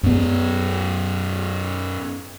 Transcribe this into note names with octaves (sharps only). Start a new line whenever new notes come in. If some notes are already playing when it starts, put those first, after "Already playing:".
F#2 B3